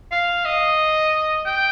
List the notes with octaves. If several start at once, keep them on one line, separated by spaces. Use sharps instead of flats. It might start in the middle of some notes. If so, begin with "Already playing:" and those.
F5
D#5
G5